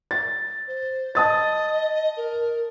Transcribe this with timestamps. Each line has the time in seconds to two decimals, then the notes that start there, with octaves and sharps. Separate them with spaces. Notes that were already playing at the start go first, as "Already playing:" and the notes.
0.11 A6
0.68 C5
1.15 D#5 A5 D#6 A6
2.17 A#4